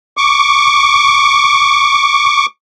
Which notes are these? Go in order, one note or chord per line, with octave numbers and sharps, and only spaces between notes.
C#6 D6